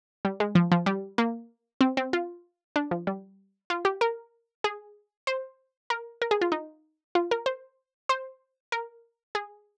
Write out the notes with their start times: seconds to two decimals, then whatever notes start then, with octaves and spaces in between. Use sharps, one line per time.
0.25 G3
0.40 G#3
0.55 F3
0.72 F3
0.86 G3
1.18 A#3
1.81 C4
1.97 C4
2.13 F4
2.76 D4
2.91 F3
3.07 G3
3.70 F4
3.85 G4
4.01 A#4
4.64 G#4
5.27 C5
5.90 A#4
6.22 A#4
6.31 G#4
6.41 F4
6.52 D#4
7.15 F4
7.31 A#4
7.46 C5
8.09 C5
8.72 A#4
9.35 G#4